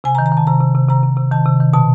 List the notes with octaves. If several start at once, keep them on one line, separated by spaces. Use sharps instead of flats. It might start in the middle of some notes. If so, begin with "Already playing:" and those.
C3 G#5
A#5
D#3
A#5
D#3 A5
C3 A#5
C3
C3
C3 A#5
C3
C3
D#3 A5
C3
D#3
B2 A5